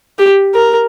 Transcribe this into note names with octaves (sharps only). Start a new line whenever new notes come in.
G4
A#4